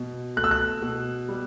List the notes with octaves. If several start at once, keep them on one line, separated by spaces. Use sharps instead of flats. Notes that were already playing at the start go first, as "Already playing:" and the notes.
Already playing: B2
A3 F#6
E6
F#6
B2
G3